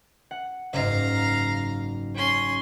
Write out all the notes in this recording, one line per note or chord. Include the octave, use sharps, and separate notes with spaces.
F#5 C#7
F#1 G#2 F5 A#5
C#4 C6